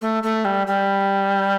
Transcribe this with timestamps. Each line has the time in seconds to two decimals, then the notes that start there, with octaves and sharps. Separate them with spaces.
0.01 A3
0.23 A3
0.45 G3
0.67 G3